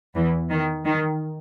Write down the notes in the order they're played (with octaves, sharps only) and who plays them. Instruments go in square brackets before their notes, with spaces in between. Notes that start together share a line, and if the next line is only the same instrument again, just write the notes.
[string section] E2 E3
D#3
D#3